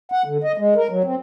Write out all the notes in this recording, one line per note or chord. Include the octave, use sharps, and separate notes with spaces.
F#5
D3
D#5
G#3
A#4
F#3
C4